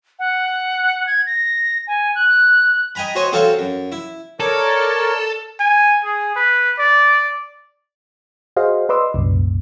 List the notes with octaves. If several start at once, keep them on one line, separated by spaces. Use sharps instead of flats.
F#5
G#6
A#6
G#5
F#6
D#5 G5 G#5 A#5 B5
F#4 C5 C#5 D#5 G#5
C4 F#4 A4 C5 C#5 F5
F#2
E4
A4 A#4 C#5 D5
G#5
G#4
B4
D5
F#4 G#4 C5 D#5 F5
B4 D5 D#5 C6 D6 E6
C2 F#2 A#2